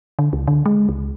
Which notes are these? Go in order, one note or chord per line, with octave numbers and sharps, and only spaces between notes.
D3
C#2
D3
G#3
C#2